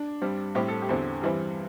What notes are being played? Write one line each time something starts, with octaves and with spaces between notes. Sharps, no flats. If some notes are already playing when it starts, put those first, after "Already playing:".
Already playing: D4
G2 G3 C4
A2 G3 C4 G4
A4
G4
E2 D3 C4
G2 E3 G3 C4